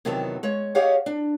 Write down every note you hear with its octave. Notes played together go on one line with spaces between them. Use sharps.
E2 C3 D#3 F#3 B3 A5
G#3 C#5
G4 G#4 C#5 D#5 F5 F#5
D4